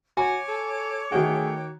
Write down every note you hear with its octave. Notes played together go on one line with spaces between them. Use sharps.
F#4 C#5 G#5 D6
A4
D#3 A3 F#4 G#4 G5